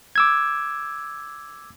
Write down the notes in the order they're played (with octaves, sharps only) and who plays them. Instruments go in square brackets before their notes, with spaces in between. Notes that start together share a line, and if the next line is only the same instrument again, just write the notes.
[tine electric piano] D6 E6 G#6